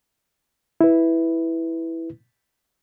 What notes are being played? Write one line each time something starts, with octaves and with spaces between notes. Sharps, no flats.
E4 B4